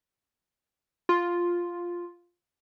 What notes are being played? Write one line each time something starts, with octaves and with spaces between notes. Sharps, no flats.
F4